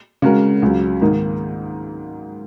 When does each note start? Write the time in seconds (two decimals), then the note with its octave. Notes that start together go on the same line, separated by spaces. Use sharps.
0.22 C#3 G#3 F#4 A#4
0.62 C#2 C#3 F#3
1.01 G#2 D#3 A#3 D#4